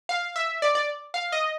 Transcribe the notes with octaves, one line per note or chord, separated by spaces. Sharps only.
F5
E5
D5
D5
F5
D#5